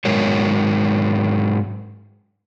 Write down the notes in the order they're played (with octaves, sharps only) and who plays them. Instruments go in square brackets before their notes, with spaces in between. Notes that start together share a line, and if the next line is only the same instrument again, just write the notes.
[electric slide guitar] G#2 F#3 G#3 A#4 C#5